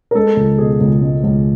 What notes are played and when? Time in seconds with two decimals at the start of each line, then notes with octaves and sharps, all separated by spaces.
0.11 A#4
0.15 G#3 A4
0.37 C#2
0.58 B2 G#4
0.81 C#2
1.02 G#3
1.24 C#2